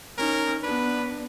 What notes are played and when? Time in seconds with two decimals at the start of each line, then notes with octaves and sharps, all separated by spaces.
0.18 C#4 D#4 A#4
0.63 B3 D4 B4